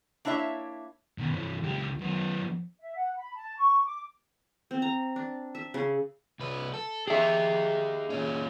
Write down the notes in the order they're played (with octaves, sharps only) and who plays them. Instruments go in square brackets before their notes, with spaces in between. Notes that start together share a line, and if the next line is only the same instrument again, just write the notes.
[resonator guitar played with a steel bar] A#3 D4 E4 C#5 E5
[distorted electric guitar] B2 D#3
G2 E3
C#2 G4
F#2 B3
[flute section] E5
F#5
B5
A5
C#6
D6
[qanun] C4
A#5
D4
E5
C#3
[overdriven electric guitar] C2 B4
A4
[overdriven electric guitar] D#4 G4 [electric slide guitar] G#4 E5
[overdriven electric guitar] A#2 C#4